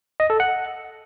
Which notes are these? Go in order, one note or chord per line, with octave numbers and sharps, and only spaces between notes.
D#5
A4
F#5